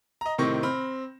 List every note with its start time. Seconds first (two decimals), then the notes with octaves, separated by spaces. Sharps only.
0.21 D#5 A#5
0.38 A2 C3 D#3 C4 C#6 A#6
0.63 C4 B5 F6